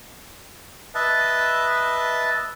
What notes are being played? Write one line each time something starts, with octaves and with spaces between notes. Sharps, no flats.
B4 D#5 E5 A5